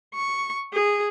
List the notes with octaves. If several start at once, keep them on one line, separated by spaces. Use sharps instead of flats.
C#6
G#4